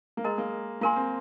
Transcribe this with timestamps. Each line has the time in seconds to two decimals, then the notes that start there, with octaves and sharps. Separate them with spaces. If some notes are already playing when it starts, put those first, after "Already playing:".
0.17 A#3
0.24 G#3 A#4 D#5 A#5
0.38 A#3
0.81 A#3 F4 A#4 G#5 C6
0.96 C4